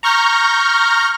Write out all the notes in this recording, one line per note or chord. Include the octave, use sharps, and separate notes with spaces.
A#5 C#6 F6 G6 A#6